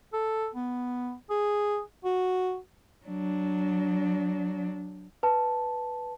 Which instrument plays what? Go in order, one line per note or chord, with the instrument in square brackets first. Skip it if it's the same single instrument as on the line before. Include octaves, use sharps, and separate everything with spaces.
[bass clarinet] A4
B3
G#4
F#4
[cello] F#3 D4
[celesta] B4 A5